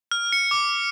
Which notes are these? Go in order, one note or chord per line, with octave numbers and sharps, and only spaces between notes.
F6
C#7
D6